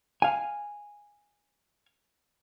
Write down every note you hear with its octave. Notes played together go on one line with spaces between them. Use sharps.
F5 G#5